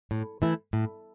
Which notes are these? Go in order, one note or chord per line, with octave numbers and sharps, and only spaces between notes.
A2
E3 A3 E4
A2